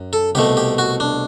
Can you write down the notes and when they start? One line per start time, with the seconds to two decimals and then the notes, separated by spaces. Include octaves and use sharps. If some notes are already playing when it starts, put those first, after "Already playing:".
Already playing: F#2
0.13 A4
0.35 C2 B2 A3 G4
0.57 G4
0.78 F#4
1.00 D4